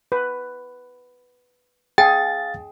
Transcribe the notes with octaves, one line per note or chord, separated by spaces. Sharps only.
B4
G#4 F5 G5 A6